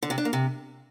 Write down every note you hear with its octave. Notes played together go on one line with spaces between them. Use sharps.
D3
C3
D4
A#3
C3